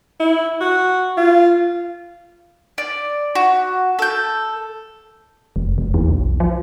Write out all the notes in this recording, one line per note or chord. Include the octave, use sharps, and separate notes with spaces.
E4
F#4
F4
D5
F#4
A4 G6
F1
F1
E2
B1
F3